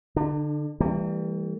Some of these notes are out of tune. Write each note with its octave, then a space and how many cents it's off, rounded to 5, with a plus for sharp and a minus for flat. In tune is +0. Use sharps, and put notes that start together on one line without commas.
D3 +0 D4 +40
E3 +0 G3 +15 A#3 -45